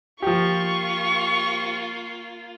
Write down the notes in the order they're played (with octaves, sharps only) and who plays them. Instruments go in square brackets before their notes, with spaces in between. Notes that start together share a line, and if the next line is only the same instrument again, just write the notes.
[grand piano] F3 G4 [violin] A#3 F4 [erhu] C#6